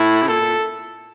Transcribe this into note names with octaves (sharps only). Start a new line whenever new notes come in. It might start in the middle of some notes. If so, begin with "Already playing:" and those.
Already playing: A2 E4
C#3
A#2 A4
A#2